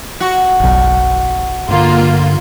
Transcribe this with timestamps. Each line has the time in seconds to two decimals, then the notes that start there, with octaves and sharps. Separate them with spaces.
0.20 F#4
0.60 F#1 B1
1.69 G2 D3 A#3 F4